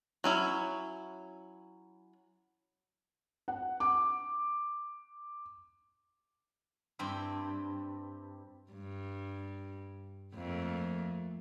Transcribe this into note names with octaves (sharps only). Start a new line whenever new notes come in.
F#3 C#4 E4
F#5
D6
G2 C4 E4
G2
F2 A3 A#3